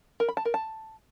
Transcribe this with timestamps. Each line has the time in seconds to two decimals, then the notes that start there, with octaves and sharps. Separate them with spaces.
0.20 A#4
0.28 B5
0.37 A5
0.45 A#4
0.54 A5